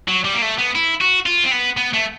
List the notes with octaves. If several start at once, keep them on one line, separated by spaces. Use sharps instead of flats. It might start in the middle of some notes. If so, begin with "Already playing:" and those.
F#3
G3
A#3
A3
B3
E4
F#4
F4
C4
B3
B3
A3